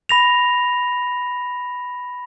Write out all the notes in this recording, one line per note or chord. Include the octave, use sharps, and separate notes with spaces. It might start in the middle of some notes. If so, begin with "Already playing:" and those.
B5 A#6 F7